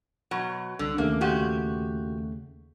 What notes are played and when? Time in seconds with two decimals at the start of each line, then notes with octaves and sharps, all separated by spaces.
0.31 B2 F#3 F#5
0.79 C2 D3
0.98 D#2 C#3 A3 A#3
1.21 A#2 F#4 G4